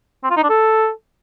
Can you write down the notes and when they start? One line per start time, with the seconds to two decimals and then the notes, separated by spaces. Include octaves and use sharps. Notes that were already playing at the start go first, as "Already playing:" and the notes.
0.24 C4
0.30 F4
0.37 D#4
0.43 D4
0.50 A4